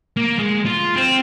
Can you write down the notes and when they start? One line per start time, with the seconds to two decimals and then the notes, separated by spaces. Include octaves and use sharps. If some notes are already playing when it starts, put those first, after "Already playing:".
0.17 A#3
0.39 G#3
0.66 F4
0.96 C4